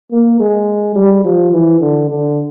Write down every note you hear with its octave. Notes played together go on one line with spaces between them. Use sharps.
A#3
G#3
G3
F3
E3
D3
D3